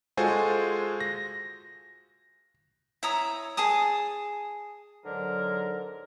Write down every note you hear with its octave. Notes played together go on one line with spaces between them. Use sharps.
G#3 F4 F#4 A4 C5 G#5
A#6
E4 C#5 A#5 D#6
G#4 G#5 A5 D#6
G#2 D3 F#3 A#4